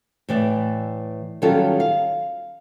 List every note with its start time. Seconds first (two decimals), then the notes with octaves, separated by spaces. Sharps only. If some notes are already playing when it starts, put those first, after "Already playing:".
0.29 A2 E3 D5
1.42 D#3 F#3 G3 C#4 F4 A4
1.80 F5